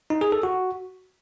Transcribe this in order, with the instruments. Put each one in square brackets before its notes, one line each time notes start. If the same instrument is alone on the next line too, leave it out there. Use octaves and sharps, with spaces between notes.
[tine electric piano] D#4
G#4
A4
F#4